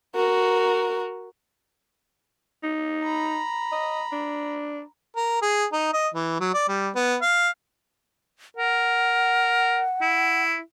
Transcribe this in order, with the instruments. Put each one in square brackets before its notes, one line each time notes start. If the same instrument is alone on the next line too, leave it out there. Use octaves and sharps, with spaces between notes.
[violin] F#4 A#4
[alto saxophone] D#4
[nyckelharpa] A#5 B5
[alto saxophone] D#5
D4
[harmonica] A#4
G#4
D#4
D#5
E3
F#3
D5
G3
B3
F5
[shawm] A#4 [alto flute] F#5
[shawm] E4